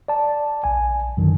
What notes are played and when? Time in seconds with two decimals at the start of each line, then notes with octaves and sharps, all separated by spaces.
0.08 D5 A5
0.64 A#1 G#5
1.17 F#2 D3 D#3 F#3